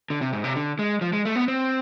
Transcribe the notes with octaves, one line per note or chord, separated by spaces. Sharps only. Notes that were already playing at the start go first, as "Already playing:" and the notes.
D3
C3
G#2
C3
D3
G#3
F3
G#3
A3
B3
C4